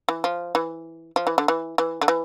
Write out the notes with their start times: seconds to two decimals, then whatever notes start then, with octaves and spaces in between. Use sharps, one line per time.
0.09 E3
0.24 F3
0.55 E3
1.16 F3
1.27 E3
1.38 D3
1.48 E3
1.78 E3
2.01 D3
2.08 E3